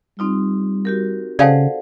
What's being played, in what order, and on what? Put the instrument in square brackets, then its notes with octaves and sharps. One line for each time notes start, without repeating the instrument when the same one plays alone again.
[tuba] G3 [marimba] C4 D#4 F4
[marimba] F#4 G4 A#4
[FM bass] C#3 [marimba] A4 C5 F#5 [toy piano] D5 F5 A5